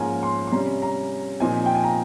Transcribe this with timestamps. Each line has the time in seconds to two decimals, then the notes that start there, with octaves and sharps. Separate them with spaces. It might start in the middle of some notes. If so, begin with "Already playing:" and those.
Already playing: G#2 F3 A#3 C#4 F4 G#5 A#5
0.23 C6
0.47 C6
0.52 C3 G3 C#4 A#5
0.82 A#5
1.40 A#2 F3 C4 D#4 G#5
1.66 G5
1.75 G#5
1.84 A#5